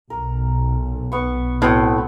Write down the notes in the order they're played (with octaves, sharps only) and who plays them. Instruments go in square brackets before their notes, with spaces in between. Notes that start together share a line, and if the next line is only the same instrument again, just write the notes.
[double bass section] B1 [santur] A#4
[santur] B3 C#6
[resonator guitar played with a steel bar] A2 [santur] B3 C4 F#4